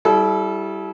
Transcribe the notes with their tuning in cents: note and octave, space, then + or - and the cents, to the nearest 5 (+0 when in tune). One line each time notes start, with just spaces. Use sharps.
G3 -15 E4 +0 A4 -40